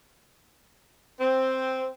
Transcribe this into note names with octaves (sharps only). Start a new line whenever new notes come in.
C4